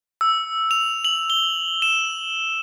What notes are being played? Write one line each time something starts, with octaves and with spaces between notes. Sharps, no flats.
E6
F7
F#7
G7
E7